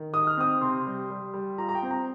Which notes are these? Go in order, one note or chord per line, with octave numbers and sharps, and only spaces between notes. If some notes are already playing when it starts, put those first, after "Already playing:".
Already playing: D#3
D#4 D#6
F6
C4 D#6
C3 C6
G3
G3
G3
F4 A#5
A#5
G5
C4
A#5